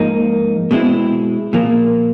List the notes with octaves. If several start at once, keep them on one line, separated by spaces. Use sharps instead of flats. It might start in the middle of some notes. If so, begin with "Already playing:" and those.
Already playing: G#2 F3 A#3 D#4
B2 G#3 C4 E4
A#2 F3 A#3